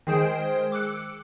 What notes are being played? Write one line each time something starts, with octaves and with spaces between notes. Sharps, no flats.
D#3 G#3 G#4 C5 G5 D7
D6 E6 F#6 C#7